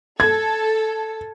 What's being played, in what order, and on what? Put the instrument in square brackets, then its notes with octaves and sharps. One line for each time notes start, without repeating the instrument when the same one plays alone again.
[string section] A4 [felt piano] G#6